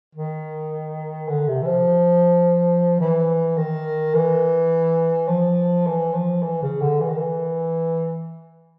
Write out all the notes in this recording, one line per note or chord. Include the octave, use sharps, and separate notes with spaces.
D#3
D3
C3
E3
F3
E3
D#3
E3
F3
E3
F3
E3
C#3
D3
E3
D#3
E3